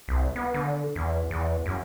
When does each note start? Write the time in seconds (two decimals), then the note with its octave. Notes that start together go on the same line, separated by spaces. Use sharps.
0.08 C2
0.36 B3
0.54 D3
0.96 E2
1.31 E2
1.66 F#2